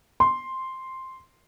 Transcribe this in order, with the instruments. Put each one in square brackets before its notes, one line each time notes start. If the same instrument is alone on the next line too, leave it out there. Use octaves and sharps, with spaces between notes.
[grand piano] C6